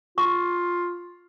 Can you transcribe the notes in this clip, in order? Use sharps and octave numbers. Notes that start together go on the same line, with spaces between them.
F4 C#6